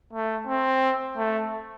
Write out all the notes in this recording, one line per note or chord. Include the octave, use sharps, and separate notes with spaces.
A3
C4
A3